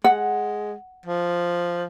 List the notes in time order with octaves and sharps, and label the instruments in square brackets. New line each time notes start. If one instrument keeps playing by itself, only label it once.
[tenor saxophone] G#3 [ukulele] F#5
[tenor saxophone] F3